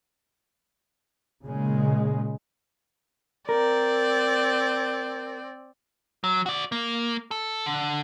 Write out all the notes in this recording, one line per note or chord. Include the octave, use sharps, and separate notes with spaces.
A#2 C#3 G#3
C4 A#4 D5
F#3
F#4 D5
A#3
A4
D3